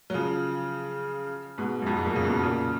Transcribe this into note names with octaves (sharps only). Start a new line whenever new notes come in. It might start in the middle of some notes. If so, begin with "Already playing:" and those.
F#3
C#3 F3
G#2 B2
F#2
F2 G#2
F#2 A#2
C#3
G#2 B2
A#2 C#3